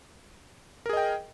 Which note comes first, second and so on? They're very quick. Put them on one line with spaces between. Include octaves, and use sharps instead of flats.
A#4 G#4 D#5 G5